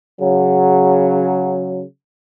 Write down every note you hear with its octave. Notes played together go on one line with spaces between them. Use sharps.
C#3 F#3